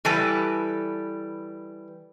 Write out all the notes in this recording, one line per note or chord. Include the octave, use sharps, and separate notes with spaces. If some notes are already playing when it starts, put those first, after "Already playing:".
E3 G3 A4 B4